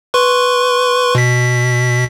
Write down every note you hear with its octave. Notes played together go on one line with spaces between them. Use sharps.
B4 C6 C#6
B2 B6